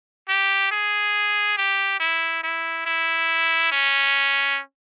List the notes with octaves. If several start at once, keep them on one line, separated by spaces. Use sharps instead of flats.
G4
G#4
G4
E4
E4
E4
C#4